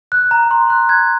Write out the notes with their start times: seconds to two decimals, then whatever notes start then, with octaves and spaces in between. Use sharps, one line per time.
0.12 F#6
0.31 A#5
0.51 C6
0.70 F#6
0.89 F#6 G#6